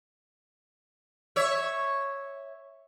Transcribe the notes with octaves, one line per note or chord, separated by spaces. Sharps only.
C#5 E5